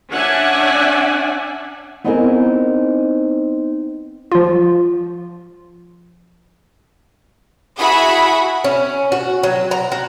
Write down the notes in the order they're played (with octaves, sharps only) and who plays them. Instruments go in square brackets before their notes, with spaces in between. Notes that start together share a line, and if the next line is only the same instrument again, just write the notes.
[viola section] C#4 D4 D5 E5 F#5 G#5
[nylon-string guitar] B3 C4 D#4 E4 G#4 A#4
[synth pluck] F3 F4
[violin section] E4 F#4 G#4 E5 F#5 B5
[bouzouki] C#4
F#4
F#3
A#5
F#4